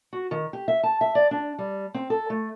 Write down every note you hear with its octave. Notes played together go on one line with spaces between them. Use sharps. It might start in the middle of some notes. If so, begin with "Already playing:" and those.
F#4
D#3
G4
E5
A5
E5
D5
D4
G3
C4
A4
A3